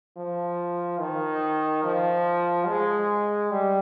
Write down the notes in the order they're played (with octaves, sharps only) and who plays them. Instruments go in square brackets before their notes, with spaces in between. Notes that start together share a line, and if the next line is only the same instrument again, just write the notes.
[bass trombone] F3
D#3
F3
G#3
G3